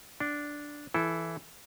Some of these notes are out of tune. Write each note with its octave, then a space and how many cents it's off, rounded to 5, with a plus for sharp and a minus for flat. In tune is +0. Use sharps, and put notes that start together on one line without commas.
D4 -5 F#5 +40
E3 +0 E4 +5 A4 -20